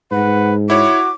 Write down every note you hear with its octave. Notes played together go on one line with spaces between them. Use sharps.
G#2 B4 F#5
E4 F#4 C#5 D6